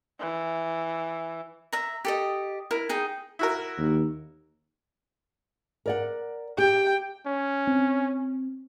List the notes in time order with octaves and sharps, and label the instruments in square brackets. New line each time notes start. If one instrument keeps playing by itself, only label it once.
[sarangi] E3
[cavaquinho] E5 A#5
G4 A4 D#5
E4 A#4
D#4 G#4 G5
[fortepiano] E4 F#4 A#4
[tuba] D#2
[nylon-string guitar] A#4 D5 F#5
[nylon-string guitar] G4 [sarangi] G5
[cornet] C#4
[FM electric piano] C4